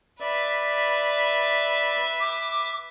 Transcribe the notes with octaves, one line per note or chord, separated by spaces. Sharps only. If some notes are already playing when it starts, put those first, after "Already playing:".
B4 D5 E5
D6